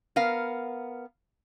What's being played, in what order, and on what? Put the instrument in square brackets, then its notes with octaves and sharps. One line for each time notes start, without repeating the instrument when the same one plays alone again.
[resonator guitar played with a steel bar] B3 A#4 F5